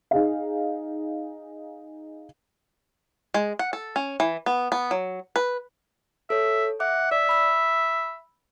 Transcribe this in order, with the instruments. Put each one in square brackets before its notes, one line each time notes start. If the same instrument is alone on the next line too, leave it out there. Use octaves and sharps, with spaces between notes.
[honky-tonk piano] D#4 G#4 F5
[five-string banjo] G#3
F#5
A4
C#4
E3
B3
B3
F#3
B4
[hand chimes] A4 C#5 [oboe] E5
[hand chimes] E5 D6 [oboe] F#5
[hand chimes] D5 [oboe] E5
[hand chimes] B5 E6